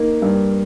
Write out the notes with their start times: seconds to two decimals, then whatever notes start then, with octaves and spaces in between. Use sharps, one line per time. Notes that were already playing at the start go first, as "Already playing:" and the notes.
Already playing: A#3 D#4
0.22 G2